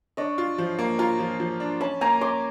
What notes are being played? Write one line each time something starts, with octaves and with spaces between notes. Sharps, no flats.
D4 C#5 D#5
F4
F3
A#3
F4 G#5 A#5
F3
F3
D4
C#4 A5 B5
A#3 G#5 A#5
C#4 C6 D6